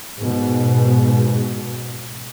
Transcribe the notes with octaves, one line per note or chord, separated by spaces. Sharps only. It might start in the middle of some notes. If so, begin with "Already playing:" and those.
G#2 B2